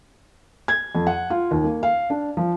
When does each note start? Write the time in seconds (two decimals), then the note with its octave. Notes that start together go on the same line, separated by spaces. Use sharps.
0.68 G#6
0.95 F2
1.07 F#5
1.30 F4
1.51 D#2
1.64 A#3
1.83 F5
2.10 D4
2.37 F3